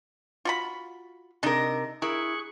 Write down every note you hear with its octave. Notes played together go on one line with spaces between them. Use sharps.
F4 F#4 B5
C3 D4 D#4 A#4 D#5
E4 G#4 A#4 C#6 F#6